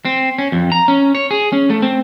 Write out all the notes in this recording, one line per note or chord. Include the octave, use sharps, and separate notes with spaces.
C4
C#4
F2
A#5
C#4
C#5
G#4
C#4
A3
C4